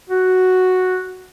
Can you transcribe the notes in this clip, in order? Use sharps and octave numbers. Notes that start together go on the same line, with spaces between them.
F#4